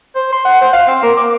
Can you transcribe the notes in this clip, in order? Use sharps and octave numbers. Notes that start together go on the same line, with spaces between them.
C5
C6
F#5
C5
F5
C4
A#3
D6